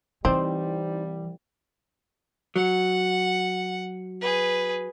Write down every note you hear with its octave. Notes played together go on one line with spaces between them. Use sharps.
C2 E3 G3 C4 D#4 C5 D5
F#3 F#5
G#4 B4